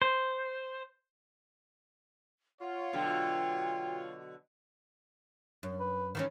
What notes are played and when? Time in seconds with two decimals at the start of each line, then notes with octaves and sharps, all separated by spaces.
0.02 C5
2.61 F4 C#5 F#5
2.93 B2 D3 F#3 G5
5.63 F#2
5.80 B4
6.15 D#3 E3 C#4